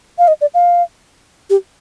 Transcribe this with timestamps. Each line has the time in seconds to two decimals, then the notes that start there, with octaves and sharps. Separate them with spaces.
0.19 F5
0.28 D#5
0.41 D5
0.54 F5
1.50 G4